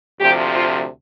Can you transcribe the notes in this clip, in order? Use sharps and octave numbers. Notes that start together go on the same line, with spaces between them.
D2 C3 F3 G4
F4